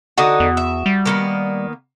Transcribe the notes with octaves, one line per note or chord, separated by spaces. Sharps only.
D3 D#4 F#4 D#6
E2
E5
G3
D#3 A#3 B3